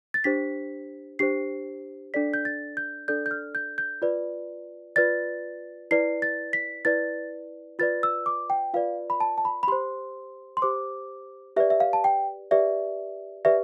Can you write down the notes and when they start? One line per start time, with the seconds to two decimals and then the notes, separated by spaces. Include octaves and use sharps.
0.14 A6
0.24 D4 G4 C5 B6
1.19 D4 G4 C5 C7
2.14 D4 A4 D5 B6
2.34 G6
2.45 A6
2.77 G6
3.08 D4 A4 D5 G6
3.26 G6
3.31 F6
3.55 G6
3.78 G6
4.02 F4 B4 D5
4.96 F4 B4 D5 A6
5.91 E4 B4 D5 C7
6.22 A6
6.53 B6
6.85 E4 B4 D5 A6
7.79 F4 B4 D5 A6
8.03 E6
8.26 D6
8.50 G5
8.74 F4 B4 D5 F5
9.10 B5
9.20 A5
9.38 A5
9.45 B5
9.63 B5
9.68 G4 C5 C6
10.57 C6
10.62 G4 C5 D6
11.56 G4 B4 D5 E5
11.70 E5
11.80 F5
11.93 A5
12.04 G5
12.51 G4 B4 D5 E5
13.45 G4 B4 D5 E5